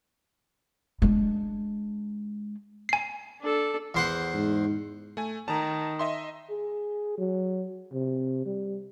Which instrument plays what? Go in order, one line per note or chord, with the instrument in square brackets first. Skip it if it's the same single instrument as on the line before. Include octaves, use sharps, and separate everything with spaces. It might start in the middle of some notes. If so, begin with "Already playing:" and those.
[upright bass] G#3 D4
[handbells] G#5 C7
[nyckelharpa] D4 A4
[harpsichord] E2 C5 F#5
[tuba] G#2
[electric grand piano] A3 G#5
[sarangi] D#3 [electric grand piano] A5 A#5
[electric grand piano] D#5 E5 C6
[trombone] G#4
F#3
C3
G3